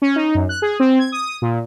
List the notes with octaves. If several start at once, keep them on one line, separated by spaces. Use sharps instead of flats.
C#4
D#4
F#2
F#6
G#4
C4
G#6
D#6
A#2